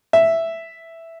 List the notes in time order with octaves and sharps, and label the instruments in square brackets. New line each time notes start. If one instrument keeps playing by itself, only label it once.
[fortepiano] E5